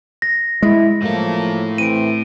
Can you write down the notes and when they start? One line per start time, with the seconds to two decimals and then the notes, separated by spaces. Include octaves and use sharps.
0.22 A#6
0.63 G#3 E4
1.02 A2 F3 F#3 A#3 A4
1.78 E3 A3 C4 D7 D#7